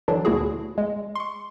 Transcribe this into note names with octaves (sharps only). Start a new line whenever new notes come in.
D3 E3 F#3 D4
D2 A#2 E4 F#4 G#4
G#3
C6 C#6